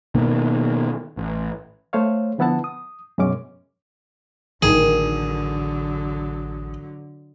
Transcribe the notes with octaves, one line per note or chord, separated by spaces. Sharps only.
B2 D#3 A#3
A1
A3 C5 C#5 F5
D3 F3 B3 E4 F#5 A5
D#6
F#2 B2 G#3 C#4 D6
A1 D3 D#3 F#3 G#4